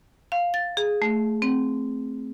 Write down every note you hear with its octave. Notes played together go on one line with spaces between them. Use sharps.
F5
A6
G#4
A3
C4